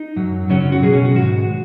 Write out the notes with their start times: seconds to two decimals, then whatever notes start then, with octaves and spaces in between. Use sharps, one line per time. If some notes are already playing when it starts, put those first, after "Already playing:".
Already playing: D#4
0.16 F#2 F#3
0.50 F#2 C#3 F#3 C#4
0.60 C#4
0.72 F#4
0.82 B2 F#3 G#4
0.93 C#4
1.05 F#4
1.15 G#2 D#3 G#3 F#4